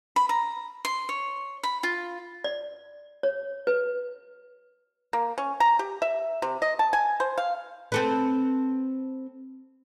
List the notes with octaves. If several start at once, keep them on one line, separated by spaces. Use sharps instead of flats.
B5
A#5
C6
C#5
B5
F4
D5
C#5
B4
A#3
C#4
A#5
G4
E5
C3
D#5
A5
G#5
C5
F5
C4 A4 B4